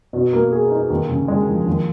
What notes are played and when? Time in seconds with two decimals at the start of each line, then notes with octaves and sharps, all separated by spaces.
0.13 B2
0.33 A#3
0.52 G#4
0.71 D#4
0.90 D#2
1.09 C#3
1.28 G#3
1.48 F3
1.67 D#2